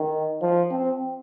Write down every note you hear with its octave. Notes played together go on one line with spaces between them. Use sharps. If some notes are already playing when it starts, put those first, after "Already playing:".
Already playing: D#3
F3
C4